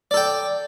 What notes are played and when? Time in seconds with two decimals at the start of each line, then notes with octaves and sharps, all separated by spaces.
0.11 D5
0.14 A4
0.17 G5